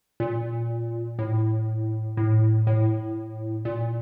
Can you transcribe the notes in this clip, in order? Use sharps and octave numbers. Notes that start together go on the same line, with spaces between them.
A#2
A2
A2
A2
A#2